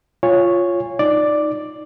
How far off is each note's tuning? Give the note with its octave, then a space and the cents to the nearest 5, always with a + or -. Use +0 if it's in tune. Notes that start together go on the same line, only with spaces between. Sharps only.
F4 +0 C#5 +0 G#5 -20
D#4 +0 D5 +0